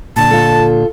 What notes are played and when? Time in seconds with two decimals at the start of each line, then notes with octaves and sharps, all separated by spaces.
0.16 A#2 D3 D4 A5
0.31 F4 A4